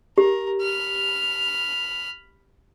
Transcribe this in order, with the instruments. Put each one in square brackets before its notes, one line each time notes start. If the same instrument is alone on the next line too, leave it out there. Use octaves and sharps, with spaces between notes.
[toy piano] G4 [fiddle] A#4
[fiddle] B5 F6